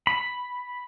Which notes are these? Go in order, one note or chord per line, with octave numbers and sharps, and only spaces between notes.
B5